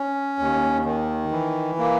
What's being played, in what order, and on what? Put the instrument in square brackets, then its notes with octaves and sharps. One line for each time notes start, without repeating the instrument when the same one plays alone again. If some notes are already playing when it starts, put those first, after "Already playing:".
Already playing: [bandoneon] C#4
D#2
D#3
E3
A#3